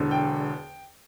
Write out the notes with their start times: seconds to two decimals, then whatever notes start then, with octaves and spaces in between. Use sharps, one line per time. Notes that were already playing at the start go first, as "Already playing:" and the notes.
Already playing: E1 E2 D3
0.11 G5